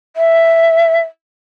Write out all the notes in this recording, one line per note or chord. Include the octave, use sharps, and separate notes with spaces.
E5